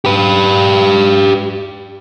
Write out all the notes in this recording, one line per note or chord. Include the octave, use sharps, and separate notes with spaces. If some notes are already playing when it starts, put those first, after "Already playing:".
G4 B4